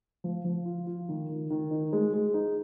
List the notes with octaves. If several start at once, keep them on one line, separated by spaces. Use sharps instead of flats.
F3
F3
F4
F4
D#3
D#3
D#3
D#4
G#3
G#3
D#4